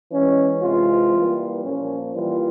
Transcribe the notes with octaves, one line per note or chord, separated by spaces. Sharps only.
E3 G#3 C#4
C3 E3 G#3 F4
E3 G3 A#3
A#2 F3 A#3 C#4
E3 G3 A#3 F4